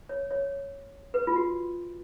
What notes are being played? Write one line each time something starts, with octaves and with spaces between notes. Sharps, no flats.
C#5
C#5
B4
F4
F#4